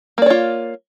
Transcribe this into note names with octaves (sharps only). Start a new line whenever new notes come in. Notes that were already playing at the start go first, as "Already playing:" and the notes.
A#3 F4 C#5 D5